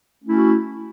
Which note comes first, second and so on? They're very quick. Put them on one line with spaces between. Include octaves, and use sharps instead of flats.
A3 C#4 E4 F#4